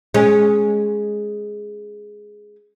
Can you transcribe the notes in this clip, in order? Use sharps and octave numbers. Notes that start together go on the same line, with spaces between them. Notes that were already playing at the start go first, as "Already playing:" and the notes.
G#3 C#4